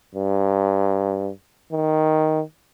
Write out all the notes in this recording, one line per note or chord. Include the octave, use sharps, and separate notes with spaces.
G2
D#3